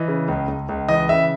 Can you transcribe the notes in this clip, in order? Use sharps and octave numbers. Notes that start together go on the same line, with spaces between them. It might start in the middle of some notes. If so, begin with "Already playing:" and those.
Already playing: E3 D#5
C#3
C#2
C#2
C#2
E3 D#5
C#3 E5